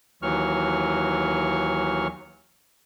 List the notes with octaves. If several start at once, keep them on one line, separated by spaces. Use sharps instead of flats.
D#2 E3 F#3 C#6 F6